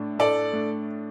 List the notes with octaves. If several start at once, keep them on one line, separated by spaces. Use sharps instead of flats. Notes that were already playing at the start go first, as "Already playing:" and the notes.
Already playing: A2 A3 D4
A2 A4 D5
A3 D4